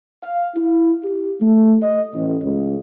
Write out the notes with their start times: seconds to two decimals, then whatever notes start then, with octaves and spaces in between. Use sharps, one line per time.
0.23 F5
0.55 E4
1.04 G4
1.40 A3
1.83 D#5
2.14 A1
2.43 C#2